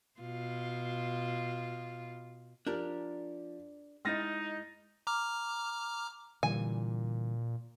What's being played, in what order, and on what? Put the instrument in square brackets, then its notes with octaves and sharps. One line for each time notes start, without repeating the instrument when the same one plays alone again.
[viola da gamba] B2 F4
[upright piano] F3 [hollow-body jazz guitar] D4 G4 A#4
[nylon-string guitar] G#3 E4 D#5 [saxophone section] D#4 [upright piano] F6 A6 A#6
[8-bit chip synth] A#5 D6 F6
[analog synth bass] A#2 [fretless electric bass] D3 E3 G3 [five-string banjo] G#5